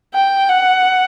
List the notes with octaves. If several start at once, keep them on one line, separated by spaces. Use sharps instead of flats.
G5
F#5